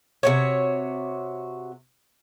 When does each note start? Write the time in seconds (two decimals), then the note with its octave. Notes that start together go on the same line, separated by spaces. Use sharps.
0.23 C3 F#4 C#5